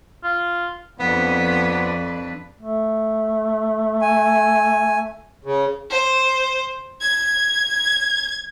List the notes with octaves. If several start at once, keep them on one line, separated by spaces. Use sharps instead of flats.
F4
F2 B3 D4 B4
A3
G#5
C#3
C5
G#6